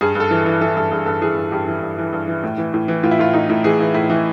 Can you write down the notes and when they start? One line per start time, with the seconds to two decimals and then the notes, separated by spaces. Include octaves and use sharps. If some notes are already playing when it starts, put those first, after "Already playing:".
0.01 G2 G#4
0.15 G2
0.20 A4
0.31 E3
0.41 A4
0.46 E3
0.61 E3 A4
0.76 G2 A4
0.91 G2 G#4
1.06 G2 A4
1.22 E3 G#4
1.37 G2
1.52 G2 G4
1.68 E3
1.82 G2
1.98 E3
2.13 G2
2.28 E3
2.44 A2
2.58 E3
2.74 A2
2.88 E3
3.03 A2 F4
3.11 E4
3.19 A2 F4
3.34 A2 D#4
3.49 A2
3.64 E3 G#4
3.80 E3
3.94 A2 E4
4.10 E3